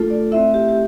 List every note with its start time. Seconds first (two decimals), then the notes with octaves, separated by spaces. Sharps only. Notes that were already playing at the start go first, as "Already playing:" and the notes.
Already playing: A3 D4 F4 A4
0.10 D5
0.32 A3 C4 E4 E5
0.54 G4
0.69 G4